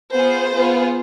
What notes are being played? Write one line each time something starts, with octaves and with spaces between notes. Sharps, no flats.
B3 F4 G#4 C5
B3 F4 G#4